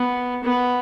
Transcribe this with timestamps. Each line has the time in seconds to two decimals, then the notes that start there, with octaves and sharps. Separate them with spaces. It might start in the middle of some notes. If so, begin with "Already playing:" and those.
Already playing: B3
0.44 B3